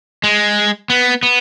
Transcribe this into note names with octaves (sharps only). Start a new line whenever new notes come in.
G#3
B3
B3